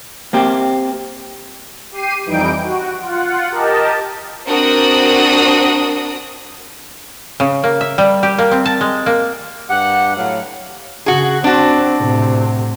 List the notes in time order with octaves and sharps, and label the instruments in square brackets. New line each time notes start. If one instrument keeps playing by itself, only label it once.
[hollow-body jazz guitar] A#3 C4 G4
[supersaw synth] G4 C7 D#7
F2 E3 G3 D#4 G5 D7
F#4
F4 F#5
G4 A#4 D#5 A5
[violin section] C4 D4 F#4 A#4 D#6
[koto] C#3
A#3
E5
G3
G4
A#3
C4
A5
G#3
A#3
[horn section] G2 G4 F#5
A2 F#3 F5
[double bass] C#3 [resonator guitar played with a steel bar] F#4 G#4
[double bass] C4 [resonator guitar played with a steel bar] D4 F#4
[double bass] A2 C3